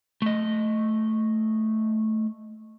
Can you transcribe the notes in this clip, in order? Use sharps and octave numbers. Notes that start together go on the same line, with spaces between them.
A3 D#5